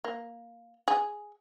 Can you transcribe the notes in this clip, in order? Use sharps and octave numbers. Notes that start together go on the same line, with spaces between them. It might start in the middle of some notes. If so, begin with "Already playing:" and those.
A#3
G#4